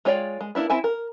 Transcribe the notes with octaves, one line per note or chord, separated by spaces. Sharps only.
G#3 F4 C#5 D5 G5
G#3
A#3 D4 E4 B4
C4 E4 E5 G#5
A#4